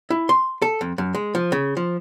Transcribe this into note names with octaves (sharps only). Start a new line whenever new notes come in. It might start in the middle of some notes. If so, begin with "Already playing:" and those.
E4
C6
A4
F2
F#2
G#3
F3
C#3
F3